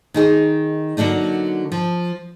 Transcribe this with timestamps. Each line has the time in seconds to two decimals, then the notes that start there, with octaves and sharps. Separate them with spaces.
0.14 D#3 D#4 G#4
0.97 D3 F#3 A#3 D4 D#4
1.72 F3